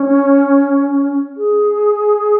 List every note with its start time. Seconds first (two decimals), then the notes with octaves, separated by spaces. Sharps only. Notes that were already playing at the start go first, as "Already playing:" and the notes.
Already playing: C#4
1.37 G#4